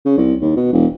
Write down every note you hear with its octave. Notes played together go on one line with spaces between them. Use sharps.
C#3
C2
D#2
B2
E1